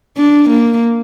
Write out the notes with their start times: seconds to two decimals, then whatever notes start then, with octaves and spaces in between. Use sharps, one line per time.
0.17 D4
0.49 A#3